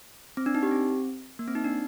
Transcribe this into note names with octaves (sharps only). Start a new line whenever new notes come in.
C4
D4
D#4
G4
C4
A#3
C4
D#4
D4